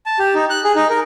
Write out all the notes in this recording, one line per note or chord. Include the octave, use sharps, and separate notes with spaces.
A5
G4
D#4
F#6
G#4
D#4
A#4